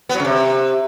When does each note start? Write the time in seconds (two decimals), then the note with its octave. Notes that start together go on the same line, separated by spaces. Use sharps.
0.09 B3
0.14 F#3
0.20 C#3
0.25 C3